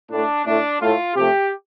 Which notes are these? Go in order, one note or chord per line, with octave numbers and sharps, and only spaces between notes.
A2 A3 D4
A2 A3 D4
A2 A3 F4
C3 F3 A3 G4